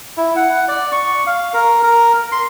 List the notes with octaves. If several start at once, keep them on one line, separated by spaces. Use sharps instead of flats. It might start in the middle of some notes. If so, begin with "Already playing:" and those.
E4
F#5
D5
C#6
F5
A#4
A#4
C6